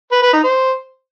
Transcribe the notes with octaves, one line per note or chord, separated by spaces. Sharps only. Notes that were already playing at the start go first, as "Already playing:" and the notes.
B4
B4
D#4
C5